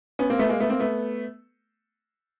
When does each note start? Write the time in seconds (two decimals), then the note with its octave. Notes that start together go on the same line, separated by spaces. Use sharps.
0.19 B3 C#4
0.30 A#3 C4
0.39 A3 B3
0.49 G#3 A#3
0.60 A3 B3
0.70 A#3 C4
0.80 A3 B3